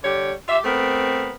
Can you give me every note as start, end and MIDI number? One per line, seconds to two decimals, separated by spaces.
0.03 0.33 50
0.03 0.33 55
0.03 0.33 67
0.03 0.33 73
0.48 0.58 65
0.48 0.58 67
0.48 0.58 76
0.64 1.33 57
0.64 1.33 59
0.64 1.33 60
0.64 1.33 70